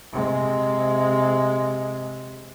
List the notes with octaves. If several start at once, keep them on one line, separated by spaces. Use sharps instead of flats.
C3 G#3